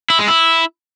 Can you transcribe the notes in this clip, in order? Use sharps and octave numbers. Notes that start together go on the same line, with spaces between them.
E4
G#3
E4